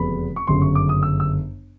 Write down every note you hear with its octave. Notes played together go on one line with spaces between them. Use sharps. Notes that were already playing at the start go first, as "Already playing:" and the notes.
Already playing: F1 E2 C#3 F#3 B3 B5
C#6
G1 F#2 C#3 C6
C#6
D6
D#6
E6
E6